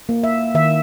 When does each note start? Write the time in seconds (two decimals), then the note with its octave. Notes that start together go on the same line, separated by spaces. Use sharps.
0.09 A#3
0.24 E5
0.55 D#3 E5